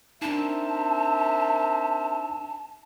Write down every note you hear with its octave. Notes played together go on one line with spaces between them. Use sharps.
C4 D4 D#4 A#4 E5 A5